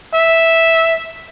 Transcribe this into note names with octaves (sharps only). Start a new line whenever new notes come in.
E5